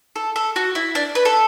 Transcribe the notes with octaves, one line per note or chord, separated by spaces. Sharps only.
A4
A4
F#4
E4
D4
B4
A4